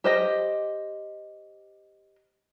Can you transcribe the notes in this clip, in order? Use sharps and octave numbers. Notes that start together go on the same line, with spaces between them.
G4 C5 D#5